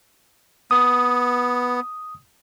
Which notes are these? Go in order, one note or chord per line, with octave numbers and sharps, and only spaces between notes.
B3 D#6